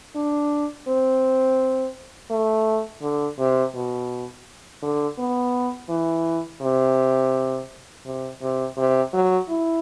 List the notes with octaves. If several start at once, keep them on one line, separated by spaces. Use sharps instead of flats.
D4
C4
A3
D3
C3
B2
D3
B3
E3
C3
C3
C3
C3
F#3
E4